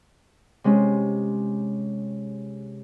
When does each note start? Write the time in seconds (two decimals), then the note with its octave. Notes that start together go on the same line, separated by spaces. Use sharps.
0.64 C3 G#3 C#4